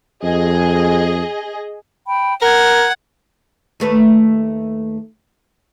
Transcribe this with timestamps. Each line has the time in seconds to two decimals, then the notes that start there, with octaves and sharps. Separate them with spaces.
0.24 F2 G#4 D#5
2.06 G5 B5
2.42 A#4 F#5 G#6
3.80 D#2 A3 B4